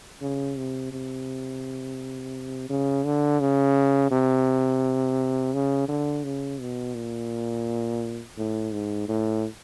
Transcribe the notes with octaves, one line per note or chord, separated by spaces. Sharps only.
C#3
C3
C3
C#3
D3
C#3
C3
C#3
D3
C#3
B2
A#2
A2
G#2
A2